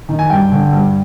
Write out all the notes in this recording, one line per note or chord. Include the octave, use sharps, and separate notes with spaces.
D#3
G#5
G2 G5
D3
G2